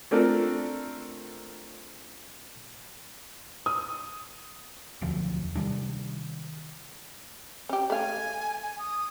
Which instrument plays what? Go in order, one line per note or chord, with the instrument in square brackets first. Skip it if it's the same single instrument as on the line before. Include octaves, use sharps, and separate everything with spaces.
[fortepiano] A3 C4 D4 F4 A4 A#4
[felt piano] D#6
[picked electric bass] E1 D2 F3 F#3
C3 D#3 G3 D4
[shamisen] C#4 G4
[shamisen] A3 F5 [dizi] G#5
[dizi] G#5
D#6